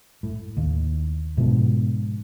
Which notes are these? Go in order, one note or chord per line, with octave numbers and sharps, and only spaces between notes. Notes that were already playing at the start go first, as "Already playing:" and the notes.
A2
D#2
G#2 B2 D3 F3